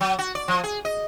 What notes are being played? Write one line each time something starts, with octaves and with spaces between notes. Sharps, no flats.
F#3
F#4
D5
F3
G#4
D#5